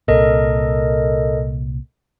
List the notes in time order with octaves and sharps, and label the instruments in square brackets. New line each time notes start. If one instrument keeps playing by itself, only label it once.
[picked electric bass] C2 A#2 [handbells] A4 A#4 D#5